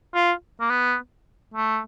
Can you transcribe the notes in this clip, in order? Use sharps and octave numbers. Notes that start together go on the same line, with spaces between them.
F4
A#3
B3
A3